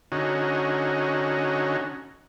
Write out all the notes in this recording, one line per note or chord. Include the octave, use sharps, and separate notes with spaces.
D3 C#4 D#4 F#4